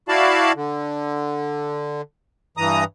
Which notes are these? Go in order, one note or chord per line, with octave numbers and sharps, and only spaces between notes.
E4 F#4 D5 F5 A5 B5
D3
G2 E3 A#5 D#6